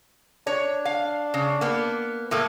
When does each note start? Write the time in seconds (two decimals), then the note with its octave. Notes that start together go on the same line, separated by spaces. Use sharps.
0.47 D4 C#5
0.85 F5
1.34 C#3
1.61 A#3 B3
2.31 A2 A3 A#3